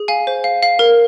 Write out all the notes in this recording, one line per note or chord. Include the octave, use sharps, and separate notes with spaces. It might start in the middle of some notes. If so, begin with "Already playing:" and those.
Already playing: G#4
F5 G#5
C5
F5
F5
A#4